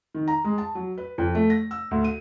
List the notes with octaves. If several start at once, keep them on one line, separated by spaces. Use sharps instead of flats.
D#3
A#5
G#3
A5
F#3
B4
F2
A3
A#6
E6
D2
D#7